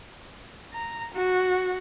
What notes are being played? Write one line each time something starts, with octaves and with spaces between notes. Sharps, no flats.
A#5
F#4